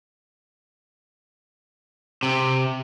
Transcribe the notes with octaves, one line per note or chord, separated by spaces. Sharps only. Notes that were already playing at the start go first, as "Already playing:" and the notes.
C3